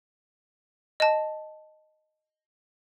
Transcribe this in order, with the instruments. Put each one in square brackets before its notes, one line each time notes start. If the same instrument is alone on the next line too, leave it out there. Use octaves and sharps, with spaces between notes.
[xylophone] D#5 A5